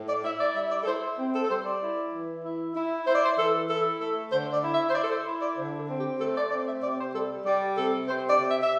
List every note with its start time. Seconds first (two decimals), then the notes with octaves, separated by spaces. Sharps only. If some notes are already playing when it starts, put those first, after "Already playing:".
Already playing: A2
0.09 D5
0.24 E4 E5
0.40 D5
0.56 G3 E5
0.71 D5
0.83 A4
0.87 E4 C5
1.19 C4
1.34 A4
1.44 A4
1.50 G3 C5
1.66 D5
1.82 E4
2.13 E3
2.44 E4
2.76 E4
3.06 E4 C5
3.15 D5
3.24 C5
3.38 E3 A4
3.69 E4 A4
4.01 A3 A4
4.32 D3 C5
4.53 D5
4.63 E4
4.74 E5
4.90 C5
4.95 E4 D5
5.04 A4
5.10 C5
5.27 E4
5.42 D5
5.57 D3 C5
5.79 A4
5.89 C4
6.00 G4
6.21 A3 A4
6.36 D5
6.51 C4 D5
6.68 E5
6.83 C3 D5
6.99 C5
7.15 G3 A4
7.46 G3 D5
7.77 C3 A4
8.08 C3 C5
8.30 D5
8.40 C3
8.51 E5
8.63 E5